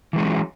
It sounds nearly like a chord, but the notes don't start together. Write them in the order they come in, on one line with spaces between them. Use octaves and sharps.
E3 G#3 C#4 A#3 F#3